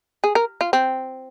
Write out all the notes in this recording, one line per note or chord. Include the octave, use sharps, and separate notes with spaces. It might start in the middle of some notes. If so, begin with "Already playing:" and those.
G#4
A#4
F4
C4